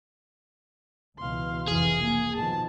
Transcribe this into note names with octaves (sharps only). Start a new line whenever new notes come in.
C#2 B2 E3 F5 C6
F1 E3 G#4
A#3 G#5
B2 D#3 F3 A5